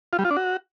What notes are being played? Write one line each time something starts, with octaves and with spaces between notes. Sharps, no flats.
F4
G3
F4
D4
F#4